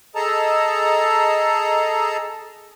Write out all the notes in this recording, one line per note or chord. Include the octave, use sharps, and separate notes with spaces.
G#4 A4 D#5 A5 A#5